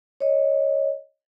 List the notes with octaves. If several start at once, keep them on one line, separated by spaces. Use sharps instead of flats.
C#5 D#5